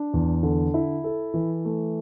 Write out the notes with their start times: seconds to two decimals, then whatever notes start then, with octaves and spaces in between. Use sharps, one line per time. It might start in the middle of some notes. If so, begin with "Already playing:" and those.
Already playing: D4
0.14 E2
0.43 D3
0.74 E4
1.04 A4
1.34 E3
1.65 A3